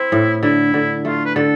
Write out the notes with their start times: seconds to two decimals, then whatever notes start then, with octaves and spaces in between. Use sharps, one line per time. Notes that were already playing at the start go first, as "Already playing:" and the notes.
Already playing: C4 E4
0.12 A2
0.43 D3 E4
0.74 D3
1.05 A3 F4
1.26 B4
1.35 D3 A4